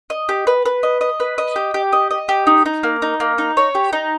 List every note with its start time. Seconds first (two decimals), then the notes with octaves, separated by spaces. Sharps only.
0.10 D#5
0.29 G4
0.47 B4
0.66 B4
0.83 D#5
1.01 D#5
1.20 B4
1.38 D#5
1.56 G4
1.74 G4
1.93 D#5
2.11 D#5
2.29 G4
2.47 D#4
2.66 D#4
2.83 A#3
3.02 D#4
3.20 A#3
3.38 D#4
3.57 C#5
3.75 G4
3.93 D#4